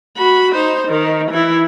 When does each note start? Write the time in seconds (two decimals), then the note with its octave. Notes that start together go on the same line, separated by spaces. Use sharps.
0.17 F#4 B5
0.55 D#4 C5
0.88 D#3
1.31 E3 E4